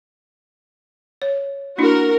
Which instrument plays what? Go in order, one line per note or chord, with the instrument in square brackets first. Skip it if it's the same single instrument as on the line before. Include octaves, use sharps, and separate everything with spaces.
[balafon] C#5
[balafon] A#3 D4 E4 [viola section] F#4 A#4